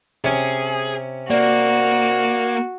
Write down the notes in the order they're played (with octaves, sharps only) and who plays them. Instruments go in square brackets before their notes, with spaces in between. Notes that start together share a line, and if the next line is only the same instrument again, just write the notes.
[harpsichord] C3 C#4 [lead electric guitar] G#4
[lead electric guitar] A#3 [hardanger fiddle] F#4 [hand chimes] D5